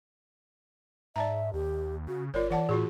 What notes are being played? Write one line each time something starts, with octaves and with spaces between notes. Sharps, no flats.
G#2 D5 E5 A5 A#5
D#2 G4
C#3 F#4
G1 F4 A#4 C#5 D5
E3 D5 F#5 A5
A2 F4 F#4 G#4